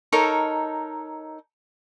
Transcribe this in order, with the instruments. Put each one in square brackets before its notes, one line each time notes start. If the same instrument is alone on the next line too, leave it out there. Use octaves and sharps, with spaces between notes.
[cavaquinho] D#4 A4 A#4 C#5